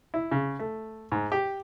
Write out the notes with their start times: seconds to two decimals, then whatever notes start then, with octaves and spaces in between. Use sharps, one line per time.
0.14 E4
0.31 C#3
0.59 A3
1.12 G#2
1.32 G4